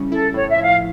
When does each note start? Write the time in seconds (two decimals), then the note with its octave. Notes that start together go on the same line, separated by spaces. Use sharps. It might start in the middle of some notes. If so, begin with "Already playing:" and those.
Already playing: C#3 G3 C#4 E4
0.11 E4 A4
0.34 A2 C#5
0.49 E5
0.56 F3
0.64 F5